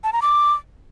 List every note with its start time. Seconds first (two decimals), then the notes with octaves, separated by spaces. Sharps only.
0.04 A5
0.13 A#5
0.22 D6